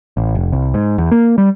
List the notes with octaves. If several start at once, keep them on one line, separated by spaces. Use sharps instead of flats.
A1
F1
C2
G#2
E2
A#3
G3